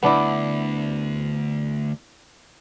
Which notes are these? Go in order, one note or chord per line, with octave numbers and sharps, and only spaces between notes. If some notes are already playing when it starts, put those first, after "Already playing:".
D2 B3 D4 E4